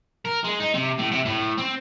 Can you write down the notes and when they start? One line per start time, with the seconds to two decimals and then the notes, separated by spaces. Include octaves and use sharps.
0.25 A#4
0.44 G#3
0.60 D#4
0.74 C3
0.99 A2
1.12 C3
1.25 A2
1.58 C4